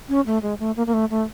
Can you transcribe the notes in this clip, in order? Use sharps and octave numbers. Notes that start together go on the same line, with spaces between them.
C#4
A3
G#3
A3
A#3
A#3
A3
A3